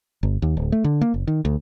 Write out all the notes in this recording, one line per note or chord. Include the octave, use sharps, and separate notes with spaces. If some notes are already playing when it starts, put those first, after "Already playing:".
G1
D#2
D1
A3
D3
A#3
F#1
D#3
D2